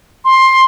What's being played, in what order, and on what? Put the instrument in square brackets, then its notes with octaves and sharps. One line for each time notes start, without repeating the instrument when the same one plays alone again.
[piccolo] C6